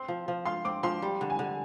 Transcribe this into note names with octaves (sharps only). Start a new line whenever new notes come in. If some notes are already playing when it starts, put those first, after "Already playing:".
Already playing: C4 C6
F3
F3
F4 C6
C4 D6
F3 C6
G3
D3
G#5
D3